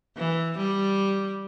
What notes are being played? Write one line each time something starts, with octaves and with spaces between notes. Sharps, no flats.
E3
G3